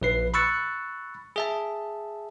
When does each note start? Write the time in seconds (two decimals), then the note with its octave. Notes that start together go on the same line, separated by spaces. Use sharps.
0.01 A#1 B4 C7
0.34 B5 C#6 E6 F#6 A6 C#7
1.36 G#4 E5 A5